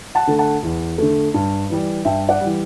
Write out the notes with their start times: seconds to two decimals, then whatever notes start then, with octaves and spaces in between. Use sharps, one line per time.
0.15 F#5 A5
0.27 D3 A3
0.39 F#5 A5
0.63 E2
0.98 D3 A3
1.34 G2
1.70 E3 G3
2.05 G2 E5 G5
2.29 D5 F#5
2.41 E3 G3